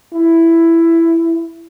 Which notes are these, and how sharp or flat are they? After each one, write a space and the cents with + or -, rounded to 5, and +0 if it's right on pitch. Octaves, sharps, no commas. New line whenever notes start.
E4 +10